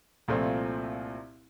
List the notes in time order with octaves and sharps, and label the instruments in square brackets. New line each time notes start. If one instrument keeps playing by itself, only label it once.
[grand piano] C2 A#2 F3 A3 C4